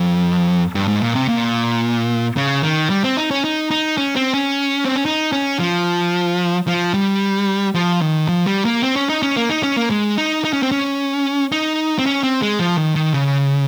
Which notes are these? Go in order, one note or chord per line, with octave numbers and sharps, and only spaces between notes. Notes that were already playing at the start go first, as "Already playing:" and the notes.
Already playing: F2
G2
G#2
A#2
C3
A#2
C#3
D#3
G3
C4
D#4
C#4
D#4
D#4
C#4
C4
C#4
C4
C#4
D#4
C#4
F3
F3
G3
F3
D#3
F3
G3
A#3
C4
C#4
D#4
C#4
A#3
D#4
C#4
A#3
G#3
D#4
D#4
C#4
C4
C#4
D#4
C4
C#4
C4
G#3
F3
D#3
D#3
C#3